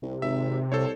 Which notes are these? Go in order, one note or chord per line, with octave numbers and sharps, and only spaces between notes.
C2 C3
G#1 E5
C2 A4 C5 C#5